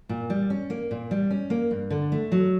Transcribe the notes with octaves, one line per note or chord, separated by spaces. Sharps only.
A#2
G3
C#4
A#3
A#2
G3
C#4
A#3
G2
D3
A3
F#3